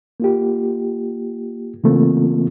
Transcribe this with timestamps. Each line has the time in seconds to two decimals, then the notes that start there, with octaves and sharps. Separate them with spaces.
0.20 A#3 F4 G4
1.84 C#3 E3 A3 A#3 C4 F4